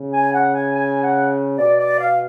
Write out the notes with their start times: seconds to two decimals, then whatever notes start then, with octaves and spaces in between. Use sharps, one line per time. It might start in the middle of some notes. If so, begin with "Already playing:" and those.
Already playing: C#3
0.13 G#5
0.34 F#5
0.55 G#5
0.76 G#5
1.03 F#5
1.58 B2 D5
1.79 D5
2.00 F5